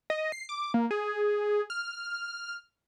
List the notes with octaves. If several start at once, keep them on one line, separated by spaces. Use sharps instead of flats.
D#5
C7
D6
A#3
G#4
F6